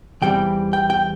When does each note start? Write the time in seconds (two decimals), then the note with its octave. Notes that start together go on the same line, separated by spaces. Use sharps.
0.22 E2 E3 G3 C4 G5
0.73 G5
0.90 G5